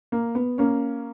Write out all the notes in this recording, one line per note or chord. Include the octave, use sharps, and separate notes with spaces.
A#3
B3
A#3 C#4